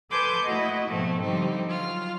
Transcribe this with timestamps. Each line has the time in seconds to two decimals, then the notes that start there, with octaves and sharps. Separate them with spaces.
0.11 A4 B4 G#5 C6 D6 G6
0.45 A3 E4 F#4 D#5
0.87 G#2 B2 F3 A3 C4
1.22 D3 F3 G3 C4 D#4
1.68 F#3 F4 F6